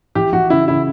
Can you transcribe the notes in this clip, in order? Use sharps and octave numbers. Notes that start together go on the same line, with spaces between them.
E3 G4
E3 F#4
C#3 E4
C#3 E4